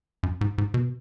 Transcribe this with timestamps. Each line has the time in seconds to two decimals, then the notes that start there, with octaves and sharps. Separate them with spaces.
0.23 F#2
0.41 G#2
0.58 G#2
0.74 B2